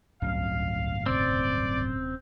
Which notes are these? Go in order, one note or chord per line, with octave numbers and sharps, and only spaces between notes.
D1 G1 C#2 F#3 C#4 F5
D#1 C3 C4 C#4 D5